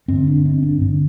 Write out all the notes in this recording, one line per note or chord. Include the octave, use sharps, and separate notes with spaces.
G2 D3 C4
D4
C4
D4
G2 D3 C4